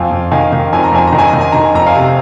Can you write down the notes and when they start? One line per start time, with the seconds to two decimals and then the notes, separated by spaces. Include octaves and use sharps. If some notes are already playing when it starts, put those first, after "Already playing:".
Already playing: F2 F5 G#5
0.11 F2
0.31 D#3 F5 G#5
0.52 D#3
0.73 F2 G#5
0.84 A#5
0.92 F2 G#5
1.07 A#5
1.13 D#3
1.18 G#5
1.29 D#3 A#5
1.41 G#5
1.52 D#3 A#5
1.65 G#5
1.74 F2 A#5
1.86 F5 G#5
1.94 C3